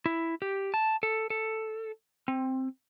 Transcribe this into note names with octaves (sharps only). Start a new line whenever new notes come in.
E4
G4
A5
A4
A4
C4